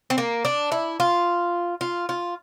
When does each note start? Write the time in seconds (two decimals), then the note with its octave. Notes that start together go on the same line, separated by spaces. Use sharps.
0.10 C4
0.18 A#3
0.45 D4
0.72 E4
1.00 F4
1.81 F4
2.09 F4